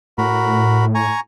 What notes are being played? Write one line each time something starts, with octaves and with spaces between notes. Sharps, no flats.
A2 F#4 A#4 B5
G#5 A#5 C#6